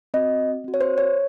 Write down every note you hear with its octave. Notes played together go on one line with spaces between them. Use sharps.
C4 F#4 D#5
C4 F#4
C#5
C5
C#5